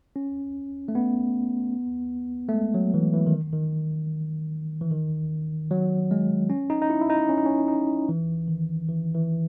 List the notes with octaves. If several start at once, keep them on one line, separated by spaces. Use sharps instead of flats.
C#4
A3
B3
A3
G#3
F#3
E3
E3
D#3
D#3
E3
D#3
F#3
G#3
C#4
D#4
D#4
E4
E4
D#4
C#4
D#4
C#4
D#4
E3
D#3
E3
E3